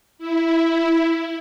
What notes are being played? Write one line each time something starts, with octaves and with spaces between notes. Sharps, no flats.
E4